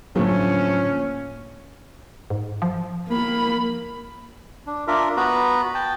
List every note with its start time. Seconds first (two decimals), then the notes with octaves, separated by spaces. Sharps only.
0.16 A2 D3 F3 F#3 A3 A#3 C#4
2.30 G#2
2.62 F3
3.08 A#3 B5
4.67 D4
4.87 D4 F4 A#4 E5
5.17 B3 F#4 B4 A#5 B5
5.75 G5 A5